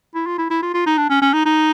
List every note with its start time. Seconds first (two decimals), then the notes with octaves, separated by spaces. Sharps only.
0.15 E4
0.26 F4
0.38 E4
0.50 E4
0.62 F4
0.74 F4
0.86 D#4
0.98 D4
1.10 C#4
1.22 C#4
1.34 D#4
1.46 D#4